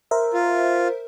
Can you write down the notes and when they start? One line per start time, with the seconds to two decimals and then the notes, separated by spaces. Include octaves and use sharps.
0.11 A#4 C5 E5
0.33 F4